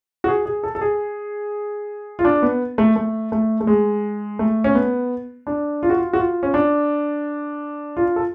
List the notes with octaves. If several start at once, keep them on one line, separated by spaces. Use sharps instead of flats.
F#4
G#4
G#4
A4
A4
G#4
F4
D4
B3
A3
A3
A3
A3
G#3
A3
C#4
B3
D4
F4
F#4
F4
F#4
F4
C#4
D4
F4
A4